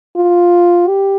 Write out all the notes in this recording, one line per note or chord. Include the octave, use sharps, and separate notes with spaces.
F4
G4